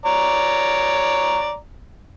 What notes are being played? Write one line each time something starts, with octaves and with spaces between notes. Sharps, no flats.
C#5 D5 A#5